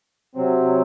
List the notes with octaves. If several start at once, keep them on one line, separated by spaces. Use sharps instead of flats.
C3 F#3 C4